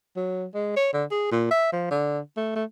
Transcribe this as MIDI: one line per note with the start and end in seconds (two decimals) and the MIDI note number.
0.16 0.45 54
0.54 0.76 56
0.76 0.89 73
0.94 1.04 50
1.11 1.29 68
1.31 1.46 46
1.51 1.70 76
1.73 1.86 53
1.91 2.19 50
2.37 2.52 57
2.56 2.64 57